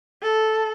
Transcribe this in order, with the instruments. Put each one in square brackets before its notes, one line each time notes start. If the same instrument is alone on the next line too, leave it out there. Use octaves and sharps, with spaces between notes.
[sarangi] A4